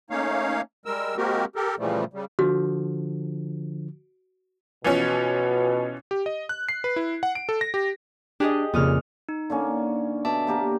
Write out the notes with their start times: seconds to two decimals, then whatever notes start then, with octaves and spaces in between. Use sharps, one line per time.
0.10 A3 A#3 C#4 D#4 C#5 F5
0.86 G3 G#3 A#4 E6
1.17 G#3 A#3 C4 F#4 G4 A#4
1.56 G4 A4 A#4
1.79 A#2 C#3 E3 F3 G3 A3
2.13 C#3 G3
2.39 D3 F3 F#4
4.84 B2 E3 F3 C#4
6.11 G4
6.26 D#5
6.49 F#6
6.69 C7
6.84 B4
6.96 E4
7.23 F#5
7.35 D7
7.49 A4
7.61 A#6
7.74 G4
8.40 D4 G4 G#4 D#5
8.74 F2 A#2 C#3 D#6 F6
9.29 D#4
9.50 D3 A#3 C#4
10.25 B2 E5 A5 D6
10.47 A#3 G4 A#4